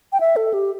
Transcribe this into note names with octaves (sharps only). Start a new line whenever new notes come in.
G5
E5
A4
G4